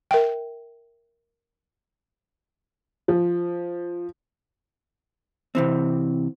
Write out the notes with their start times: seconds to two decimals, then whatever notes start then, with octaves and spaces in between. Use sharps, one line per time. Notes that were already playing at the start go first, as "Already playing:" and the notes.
0.11 A#4 E5 G5
3.08 F3
5.55 C3 E3 C4